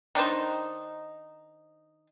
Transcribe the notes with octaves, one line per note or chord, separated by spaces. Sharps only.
D#3 D4 D#4 C5